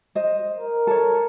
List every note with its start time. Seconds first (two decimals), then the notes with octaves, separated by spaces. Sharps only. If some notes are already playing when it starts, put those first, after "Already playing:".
0.15 C5 D#5
0.56 A#4
0.87 A4 C#5